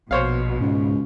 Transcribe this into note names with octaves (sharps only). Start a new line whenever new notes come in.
A#1 B2 C5 C#5 F5
C#2 G#2